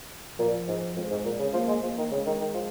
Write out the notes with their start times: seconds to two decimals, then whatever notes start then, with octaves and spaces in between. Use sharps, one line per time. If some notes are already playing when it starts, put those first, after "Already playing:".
0.39 A#2 F3
0.68 G#2
0.96 F2 G#3
1.10 G#2
1.25 A#2
1.39 C#3
1.53 F3 A#3
1.68 G#3
1.82 F3 A#3
1.98 D#3
2.11 C#3 G#3
2.26 D#3
2.40 D#3
2.54 F3